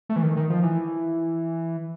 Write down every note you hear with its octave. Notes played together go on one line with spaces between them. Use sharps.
A3
E3
D#3
D#3
F3
E3